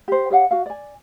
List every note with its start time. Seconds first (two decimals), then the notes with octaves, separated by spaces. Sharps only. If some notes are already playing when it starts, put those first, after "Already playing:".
0.08 G4 C5
0.30 G4 C#5 F5 F#5
0.51 F#4 F5
0.66 D5 G#5